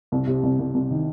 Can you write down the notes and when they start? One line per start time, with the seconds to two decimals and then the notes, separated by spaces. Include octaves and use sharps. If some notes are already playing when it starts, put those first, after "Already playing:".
0.12 C2
0.27 C3
0.43 C2
0.59 C2
0.74 C2
0.91 D#3